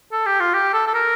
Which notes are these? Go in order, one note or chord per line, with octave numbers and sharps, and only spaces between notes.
A4
G4
F4
G4
A4
A4
A#4